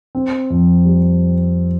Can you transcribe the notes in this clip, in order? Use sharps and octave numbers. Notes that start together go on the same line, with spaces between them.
C4
F2
G3